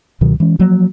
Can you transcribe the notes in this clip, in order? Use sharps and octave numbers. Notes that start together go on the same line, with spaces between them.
C#2 B2 D#3 F#3
E3 G#3 C#4
F3 F#3 A#3